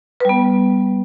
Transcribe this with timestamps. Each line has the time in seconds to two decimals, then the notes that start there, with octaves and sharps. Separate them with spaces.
0.20 B4
0.25 G3
0.29 B3